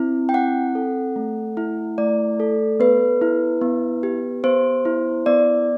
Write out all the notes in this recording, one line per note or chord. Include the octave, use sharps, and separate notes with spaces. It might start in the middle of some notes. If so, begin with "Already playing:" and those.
Already playing: C4 E4
G5
C4 F#5
A4
A3
E4
A3 D5
A4
B3 B4
E4
B3
G4
B3 C5
E4
B3 D5